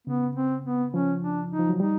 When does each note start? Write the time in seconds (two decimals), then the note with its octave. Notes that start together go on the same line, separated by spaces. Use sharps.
0.07 C#3 B3
0.35 C4
0.64 B3
0.93 F3 C#4
1.22 D4
1.51 D#4
1.59 F3
1.69 F#3
1.80 G3 D#4